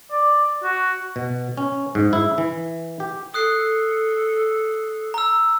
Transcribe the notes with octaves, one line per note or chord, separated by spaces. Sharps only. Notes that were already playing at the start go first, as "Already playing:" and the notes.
D5
F#4
B2
C#4
G#2
E4
E3
G4
A4 D#6 F#6 C7
A#5 E6